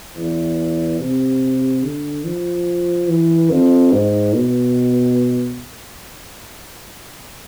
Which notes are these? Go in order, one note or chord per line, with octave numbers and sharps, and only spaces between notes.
E2
C3
D3
F3
E3
F2
G#2
B2